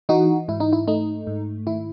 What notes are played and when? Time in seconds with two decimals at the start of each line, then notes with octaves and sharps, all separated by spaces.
0.09 E3 D#4 F#4
0.48 G#2 E4
0.60 D#4
0.73 E4
0.88 A3 D#4
1.27 G#2
1.67 D#3 E4